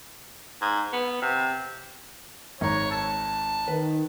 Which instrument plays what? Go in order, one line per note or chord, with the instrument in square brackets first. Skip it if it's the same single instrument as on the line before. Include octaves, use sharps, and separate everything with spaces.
[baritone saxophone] G#2
B3
C3
[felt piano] G#1 A#5 [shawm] C#5
[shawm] A5
[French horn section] D#3 [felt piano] B4